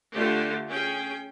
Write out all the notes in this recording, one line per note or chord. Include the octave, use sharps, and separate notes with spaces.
D3 A3 F4 G4
C#4 G#4 G5